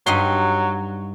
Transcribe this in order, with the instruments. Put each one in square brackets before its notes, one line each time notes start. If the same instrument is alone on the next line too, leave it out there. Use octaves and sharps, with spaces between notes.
[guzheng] G2 D#4 C6 [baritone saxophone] F#3